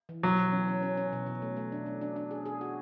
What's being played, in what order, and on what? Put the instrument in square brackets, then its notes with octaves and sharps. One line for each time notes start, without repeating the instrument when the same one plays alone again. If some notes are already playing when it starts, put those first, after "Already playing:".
[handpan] E3
[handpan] B2 [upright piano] F#3
[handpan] B2
C#4
C#4
C#4
C#4
B2
B2
A3
A3
D4
D4
D4
D4
G#4
G#4
F#4